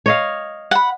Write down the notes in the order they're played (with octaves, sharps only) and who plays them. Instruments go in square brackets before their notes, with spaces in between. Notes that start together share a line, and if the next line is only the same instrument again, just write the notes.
[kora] C#5 D#5 F5
[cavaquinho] F#5 B5